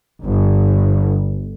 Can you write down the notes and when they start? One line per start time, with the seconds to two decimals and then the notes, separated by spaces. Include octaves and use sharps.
0.22 G1